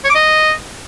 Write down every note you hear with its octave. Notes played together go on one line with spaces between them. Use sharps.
C#5
D6
D#5